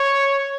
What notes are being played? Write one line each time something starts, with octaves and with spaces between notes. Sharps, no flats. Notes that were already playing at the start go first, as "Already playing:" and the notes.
Already playing: C#5